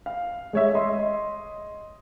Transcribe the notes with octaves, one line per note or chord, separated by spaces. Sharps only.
F5
G#3 C#5 E5
D#5 C6